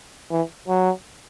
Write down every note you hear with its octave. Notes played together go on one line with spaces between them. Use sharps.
E3
F#3